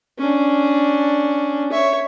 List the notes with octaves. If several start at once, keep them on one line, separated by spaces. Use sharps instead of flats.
C#4 D4
C#5 E5